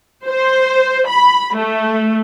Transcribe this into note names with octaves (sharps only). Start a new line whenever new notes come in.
C5
B5
A3